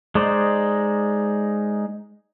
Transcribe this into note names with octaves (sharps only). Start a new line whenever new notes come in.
G#3 D#4 C5 D5